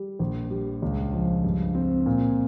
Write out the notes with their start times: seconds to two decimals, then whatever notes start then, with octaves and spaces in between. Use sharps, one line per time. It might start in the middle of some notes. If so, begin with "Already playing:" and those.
Already playing: G3
0.19 A#1
0.50 G3
0.82 C#2
1.13 F3
1.44 G2
1.75 C4
2.06 A#2